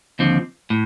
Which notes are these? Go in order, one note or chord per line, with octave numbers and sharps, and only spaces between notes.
D#2 D3 F3 C4
A2